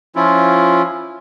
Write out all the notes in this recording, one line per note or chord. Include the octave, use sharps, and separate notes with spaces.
F3 C#4 E4 F4